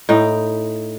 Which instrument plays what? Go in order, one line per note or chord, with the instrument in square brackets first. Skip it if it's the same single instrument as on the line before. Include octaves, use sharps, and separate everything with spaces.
[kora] A2 D#4 G5